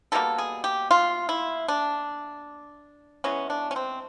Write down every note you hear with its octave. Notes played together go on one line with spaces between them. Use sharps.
B2 G3 A#3 A4
G#4
G4
F4
E4
D4
E3 G#3 B3 C#4
D4
C#4
C4